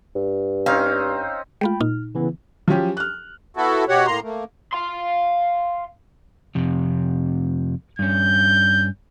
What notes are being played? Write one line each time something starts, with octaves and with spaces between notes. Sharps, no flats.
G2
C4 C#4 D#4 F5
G#3 A3 F4 G5 B5
A#2 D#4 F6
C#3 E3 B3
F3 F#3 C#4 G4
F6 F#6
B3 E4 F#4 A4
B2 F#4 G4 C#5 F#5
A2 A#3 A#5 C6
A3 A#3
F5 C6
F2 C3
G2 C#4 G6